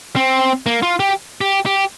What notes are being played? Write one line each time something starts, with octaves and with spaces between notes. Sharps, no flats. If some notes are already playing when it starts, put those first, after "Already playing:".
C4
A#3
F4
G4
G4
G4